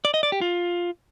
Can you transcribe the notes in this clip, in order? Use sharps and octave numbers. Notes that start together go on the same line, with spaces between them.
D5
D#5
D5
G4
F4